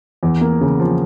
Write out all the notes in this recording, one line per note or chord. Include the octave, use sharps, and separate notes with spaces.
E2
A#3
C#3
F3